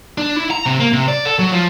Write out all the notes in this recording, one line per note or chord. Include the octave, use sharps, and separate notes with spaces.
D4
E4
A#5
C3
A#3
C3
D5
A4
F#3
F3